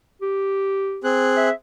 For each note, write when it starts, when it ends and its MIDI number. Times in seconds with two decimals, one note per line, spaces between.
0.22 1.03 67
1.04 1.49 60
1.04 1.49 68
1.04 1.49 90
1.37 1.53 76